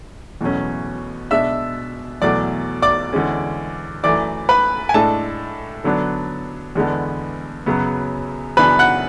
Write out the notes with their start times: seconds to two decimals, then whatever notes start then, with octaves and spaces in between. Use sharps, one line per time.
0.41 E2 B2 F#3 A3 C#4
1.31 B2 G#3 D4 E5 E6
2.22 E2 B2 F#3 A3 D5 D6
2.82 D5 D6
3.12 E2 D3 G#3 C#4
4.03 F#2 E3 A3 D5 D6
4.49 B4 B5
4.89 G#5
4.94 A2 G#3 D4 A4 A5
5.84 D3 F#3 B3 D4
6.75 E2 D3 G#3 B3 D4
7.66 F#2 C#3 F#3 B3
8.57 F#2 C#3 E3 B3 D4 B4 B5
8.79 F#5 F#6